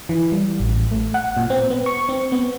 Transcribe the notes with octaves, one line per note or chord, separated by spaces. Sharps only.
E3
G3
A1
A3
F#5
A#2
C4
B3
C#6
C4
B3